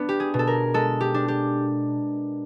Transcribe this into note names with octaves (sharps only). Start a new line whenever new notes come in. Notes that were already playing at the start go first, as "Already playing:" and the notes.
Already playing: B3 D4
G4
G#4
B2
A4
A#4
G#3 A4
G4
D4
G4